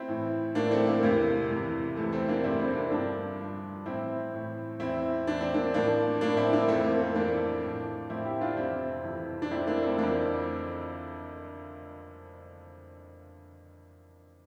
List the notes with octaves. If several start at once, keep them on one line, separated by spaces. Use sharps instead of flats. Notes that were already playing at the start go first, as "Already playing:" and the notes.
Already playing: C4 E4
A2 E3
A2 E3 A#3 D4
A3 C4
A#3
E2 C3 E3 A#3
E2 C3 E3
E2 C3 E3 A3
A3 C4
A#3 D4
E2 C3 E3 C4 E4
C4 E4
C4
A#3 D4
G2 F3 A#3 D4
G2 F3
A2 E3 C4 E4
A2 E3
E2 E3 C4 E4
E2 E3 D4
C4
A#3 D4
A2 F3 A#3 D4
A2 F3 A#3 D4
C4 E4
A#3 D4
F2 E3 A3 C4
A#3
A#3
F2 E3 A#3 D4
A2 F3
A2 F3 C4 E4
E4 G4
D4 F4
F2 C3 E3 C4 E4
F2 C3 E3
D4
F2 E3 C4 E4
A#3 D4
A3 C4
F2 E3 A#3 D4